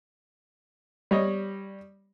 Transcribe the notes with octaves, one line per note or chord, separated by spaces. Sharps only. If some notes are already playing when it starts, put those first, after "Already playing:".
G3 C#5 D#5